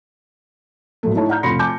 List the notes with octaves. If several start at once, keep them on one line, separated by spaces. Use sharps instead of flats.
A#2 F#3 A3
A3 D#4 E4 C#5 A5
D5 F#5 A#5 F6 G6
F1 F4 B5 C6 A#6 C#7
G#5 A5 D6 G6